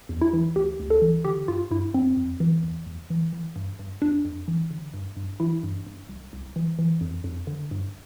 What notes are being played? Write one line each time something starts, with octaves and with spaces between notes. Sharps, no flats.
E2
E4
E3
D2 G4
D2
A4
E3
D3 G4
G2 F4
G2 E4
F2 C4
F2
E3
E2
E2
E3
E3
G2
G2
F2 D4
F2
E3
D3
G2
G2
E3 E4
G2
G2
C2
C2
E3
E3
F2
F2
D3
G2